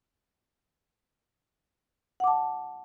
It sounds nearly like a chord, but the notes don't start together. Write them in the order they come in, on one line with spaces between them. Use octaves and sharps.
F#5 D6 A5